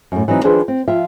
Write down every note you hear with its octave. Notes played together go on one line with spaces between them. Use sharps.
F#2 A2
E3 F#3 C4 D#4
D#3 F3 D4 G#4 B4 C5
C4
F3 F4 E5 G5